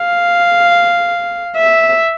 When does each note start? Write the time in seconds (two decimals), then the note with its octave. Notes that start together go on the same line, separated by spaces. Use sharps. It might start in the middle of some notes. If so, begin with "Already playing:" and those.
Already playing: F5
1.57 E5